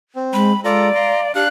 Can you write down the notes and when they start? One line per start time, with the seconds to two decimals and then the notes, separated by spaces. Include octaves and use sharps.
0.16 C4
0.33 G#3 B5
0.64 G#3 F4 A4 D5 A#5
0.95 F5 A#5 C6
1.35 D4 G4 F5 F#6